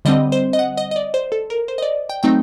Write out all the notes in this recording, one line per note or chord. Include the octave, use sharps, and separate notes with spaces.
D3 G3 C4 D#5
C5
D#5
F#5
D#5
D#5
D5
C5
A4
A#4
C5
D#5
D5
G5
F#3 A3 C4 D#4 G5